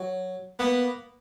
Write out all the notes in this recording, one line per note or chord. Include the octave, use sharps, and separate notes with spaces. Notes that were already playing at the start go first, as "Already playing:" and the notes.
Already playing: F#3
A#3 B3